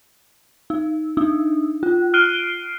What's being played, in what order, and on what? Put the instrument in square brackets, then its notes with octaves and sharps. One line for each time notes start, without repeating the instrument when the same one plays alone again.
[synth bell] D#4
D4 D#4
F4
F6 F#6 C7 D7 D#7 G7